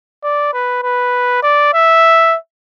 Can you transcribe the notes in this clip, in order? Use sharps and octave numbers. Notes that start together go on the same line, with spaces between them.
D5
B4
B4
D5
E5